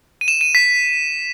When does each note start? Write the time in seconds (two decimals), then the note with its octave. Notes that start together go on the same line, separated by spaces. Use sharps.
0.21 D#7
0.28 E7
0.41 D#7
0.55 B6